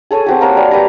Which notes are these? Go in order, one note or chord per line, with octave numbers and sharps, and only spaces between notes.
G#4 A4 C#5 G#5
C4 F#4 G4
A#3 A#4 C#5 F#5
G3
G4 B4 C#5 A#5